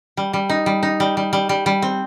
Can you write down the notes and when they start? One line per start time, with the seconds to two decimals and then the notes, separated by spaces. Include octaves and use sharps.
0.17 G3
0.33 G3
0.50 D#4
0.66 G3
0.83 D#4
1.00 G3
1.17 G3
1.33 G3
1.49 G3
1.66 G3
1.82 C4